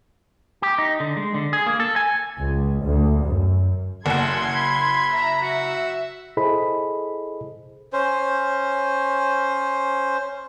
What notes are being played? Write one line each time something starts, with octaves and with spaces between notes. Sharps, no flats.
G4
D#4
D3
G#3
D3
G#4
A#3
A4
G#5
C#2
D2
F#2
F#1 A4 F#5 C6 G#6
B5
E5 A#5
F#4 E5
E4 G#4 A4 C5 D#5 B5
C#4 C5